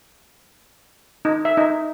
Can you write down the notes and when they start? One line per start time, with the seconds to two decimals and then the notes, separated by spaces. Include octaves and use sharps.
1.25 D#4
1.45 E5
1.57 D#4